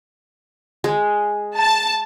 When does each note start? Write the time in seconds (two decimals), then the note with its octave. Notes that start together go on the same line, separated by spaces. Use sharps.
0.84 G#3
1.59 A5